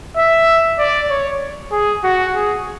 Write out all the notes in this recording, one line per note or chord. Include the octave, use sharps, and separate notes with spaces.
E5
D5
C#5
G#4
F#4
G#4